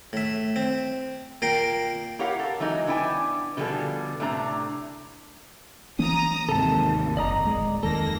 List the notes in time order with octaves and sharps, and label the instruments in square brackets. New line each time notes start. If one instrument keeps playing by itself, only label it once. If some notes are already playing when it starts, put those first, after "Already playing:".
[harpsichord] A2 E5
C4
A#2 A#4 F5 G5
[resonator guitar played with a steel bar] E4 G4 A#4 C#5 F5 F#5
A4 A#4
E3 F#3 G#3 D#4
B3 D4 E4 G5 G#5
B2 D3 F3 G3 G#4 A4
A2 C3 A3 D4 A#5
[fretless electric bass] E3 A#3 C#4 [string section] A#5 D#6
[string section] G#1 D#2 [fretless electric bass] G#2 C3 [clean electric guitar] A4 A5
[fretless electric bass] F#1 [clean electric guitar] D5 D#5 A#5
[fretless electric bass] D1 G#3
[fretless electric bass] F2 D#3 G#3 [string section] A#3 A#6 [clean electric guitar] A4